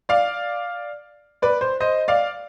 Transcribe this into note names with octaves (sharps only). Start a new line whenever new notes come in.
D5 F5
B4 D5
C5
C5 D#5
D5 F5